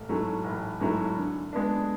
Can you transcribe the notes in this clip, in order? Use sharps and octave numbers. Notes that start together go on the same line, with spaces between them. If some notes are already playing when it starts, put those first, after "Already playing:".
Already playing: A1
G#2 F#3 A3 E4
A1
G#2 F#3 A3 E4
D3
G#3 B3 D4